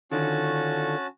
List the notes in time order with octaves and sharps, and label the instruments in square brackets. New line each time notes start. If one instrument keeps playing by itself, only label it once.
[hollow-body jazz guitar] D3 D#3 [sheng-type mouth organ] C#4 F#4 A5 [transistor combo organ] D4 F4 A4